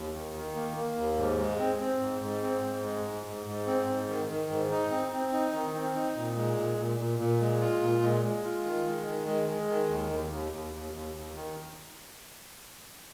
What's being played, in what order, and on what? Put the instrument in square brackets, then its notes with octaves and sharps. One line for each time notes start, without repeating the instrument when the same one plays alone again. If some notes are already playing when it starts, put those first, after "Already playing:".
Already playing: [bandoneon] D#2
D#3
D#3
A#3
A#3
D#2
G#2
G#3
C4
C4
G#2
G#2
C4
G#2
G#3
G#2
G#2
G#2
C4
G#2
D#3
D#3
G#2
D#4
C4
C4
D#4
D#3
C4
D#4
A#2
G#3
A#2
A#2
A#2
A#2
G#3
F4
A#2
G#3
G#3
F4
D#3
G#3
D#3
G#3
G#3
D#3
D#2
D#2
D#2
D#2
D#2
D#2
D#2
D#3